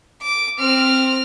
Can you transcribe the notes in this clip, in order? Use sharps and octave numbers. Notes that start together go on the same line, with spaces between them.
D6
C4 F6